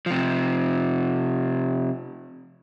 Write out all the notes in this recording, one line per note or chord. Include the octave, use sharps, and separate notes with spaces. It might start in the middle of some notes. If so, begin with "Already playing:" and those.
C3 F3